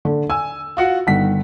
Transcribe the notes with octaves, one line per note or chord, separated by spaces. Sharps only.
D3
G#5 E6
F4 F#4 F#5
G1 D#3 F#5 B6